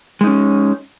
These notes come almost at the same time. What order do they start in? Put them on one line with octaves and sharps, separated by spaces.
G#3 D#4 C#4